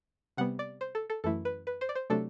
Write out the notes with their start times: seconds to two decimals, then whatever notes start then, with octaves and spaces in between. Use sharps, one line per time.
0.37 C3 G3 B3 F#5
0.59 D5
0.81 C5
0.95 A4
1.10 A4
1.24 F#2 E3 A3 E4 A4
1.45 B4
1.67 B4
1.81 C5
1.89 D5
1.95 C5
2.10 C3 F#3 A3 D4 A4